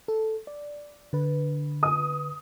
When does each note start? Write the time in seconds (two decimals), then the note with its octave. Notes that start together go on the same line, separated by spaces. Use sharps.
0.08 A4
0.47 D5
1.13 D3 B4
1.83 D#6